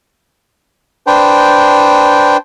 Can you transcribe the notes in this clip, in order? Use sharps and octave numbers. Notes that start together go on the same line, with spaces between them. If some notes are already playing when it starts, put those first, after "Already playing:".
D4 B4 C5 G5